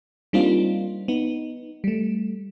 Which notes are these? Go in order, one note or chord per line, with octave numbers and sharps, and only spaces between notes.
G3 A#3 C4 D4 D#4 F4
B3 D#4
G3 A3